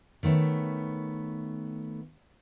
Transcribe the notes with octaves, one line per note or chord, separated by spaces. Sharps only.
D#3 A3 B3 C#5